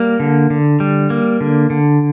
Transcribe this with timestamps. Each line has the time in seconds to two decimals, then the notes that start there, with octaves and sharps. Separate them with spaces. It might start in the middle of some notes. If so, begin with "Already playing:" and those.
Already playing: G3 A#3
0.20 D3
0.50 D3
0.80 G3
1.10 A#3
1.41 D3
1.70 D3